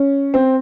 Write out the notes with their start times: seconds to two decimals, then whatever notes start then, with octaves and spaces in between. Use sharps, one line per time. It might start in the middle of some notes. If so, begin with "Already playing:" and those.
Already playing: C#4
0.34 C4